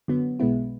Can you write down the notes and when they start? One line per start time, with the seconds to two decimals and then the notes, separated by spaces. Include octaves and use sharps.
0.08 F#2 D3 F#3 B3
0.39 B1 B2 G#3 B3 E4